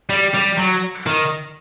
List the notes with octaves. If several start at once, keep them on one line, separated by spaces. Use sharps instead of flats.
G3
G3
F#3
D#3